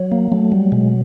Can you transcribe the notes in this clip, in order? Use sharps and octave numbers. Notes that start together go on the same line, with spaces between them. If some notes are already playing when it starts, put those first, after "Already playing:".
Already playing: F#3
A#3
F#3 A3
G3
B2 G#3